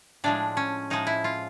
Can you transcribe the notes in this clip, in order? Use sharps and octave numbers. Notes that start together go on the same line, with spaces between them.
A2 F3 G#3 D4
C#4
A2 F3 G#3 D#4
E4
F4